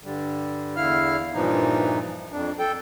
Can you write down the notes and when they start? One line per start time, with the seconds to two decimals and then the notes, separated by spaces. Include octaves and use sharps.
0.04 G2 D3 G3
0.76 E2 D3 E4 F5 F6
1.34 G2 A#2 E3 F3 D#4
2.32 F2 D4
2.59 A4 G5